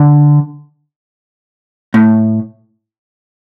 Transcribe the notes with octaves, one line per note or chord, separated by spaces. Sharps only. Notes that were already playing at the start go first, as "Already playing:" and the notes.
Already playing: D3
A2